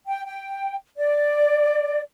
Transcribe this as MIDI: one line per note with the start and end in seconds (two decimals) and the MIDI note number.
0.07 0.22 79
0.26 0.76 79
0.97 2.01 74